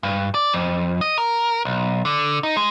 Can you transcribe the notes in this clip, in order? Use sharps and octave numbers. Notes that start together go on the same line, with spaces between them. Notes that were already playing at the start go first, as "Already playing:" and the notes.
G2
D5
F2
D#5
A#4
B1
D3
D#4
G#3